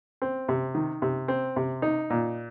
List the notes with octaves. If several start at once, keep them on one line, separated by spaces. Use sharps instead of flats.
C4
C3
D#3
C3
C4
C3
D#4
A#2